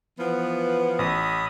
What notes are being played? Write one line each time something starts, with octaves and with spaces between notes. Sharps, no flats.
E3 F3 B3
A1 B5 D#6